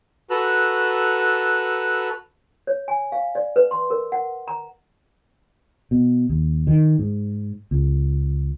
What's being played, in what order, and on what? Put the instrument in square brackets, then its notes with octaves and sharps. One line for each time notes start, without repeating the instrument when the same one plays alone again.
[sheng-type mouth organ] F#4 A4 B4 A#5 E6 F#6
[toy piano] C#5
G#5
F5
D5
B4
C6
A#4
F#5
A#5
[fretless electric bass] B2
D#2
D#3
G#2
C#2